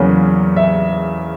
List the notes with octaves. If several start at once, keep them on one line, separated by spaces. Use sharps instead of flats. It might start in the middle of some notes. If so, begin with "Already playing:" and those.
Already playing: E2 C#3 F#3 A#3 C#4
E5